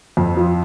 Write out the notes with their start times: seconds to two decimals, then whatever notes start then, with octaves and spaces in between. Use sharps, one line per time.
0.17 F2
0.37 F3